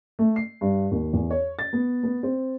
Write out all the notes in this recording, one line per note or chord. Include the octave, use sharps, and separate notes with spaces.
A3
C7
G2
D#2
E2
C#5
A6
B3
B3
C4